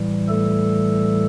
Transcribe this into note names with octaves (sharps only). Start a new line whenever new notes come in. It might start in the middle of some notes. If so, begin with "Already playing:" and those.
Already playing: A2 E3 G3
A3 A4